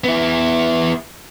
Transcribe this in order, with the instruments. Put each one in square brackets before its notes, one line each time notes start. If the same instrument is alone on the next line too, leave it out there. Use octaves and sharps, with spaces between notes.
[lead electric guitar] B3 E4